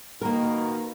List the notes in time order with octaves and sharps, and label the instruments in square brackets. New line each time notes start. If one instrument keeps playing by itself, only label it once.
[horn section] B2 D#3 [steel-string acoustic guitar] A#3 A#4